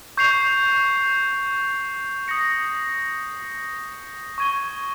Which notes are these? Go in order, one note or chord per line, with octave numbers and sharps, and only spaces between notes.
C#6 G6 C7 F7
D#6 A#6 C#7
C#6 G#6 D#7 G7